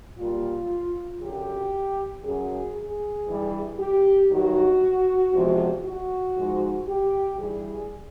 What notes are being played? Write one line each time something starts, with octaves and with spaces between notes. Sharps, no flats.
A#2 G3 F4
F#2 D3 F#3 G4
F#2 C#3 F#3 G#4
G#4
G2 E3 G3
G4
G2 D#3 F#3 F#4
E2 C3 F3 G#3
F#4
G#2 F3 G#3
G4
G2 E3 G3 G#4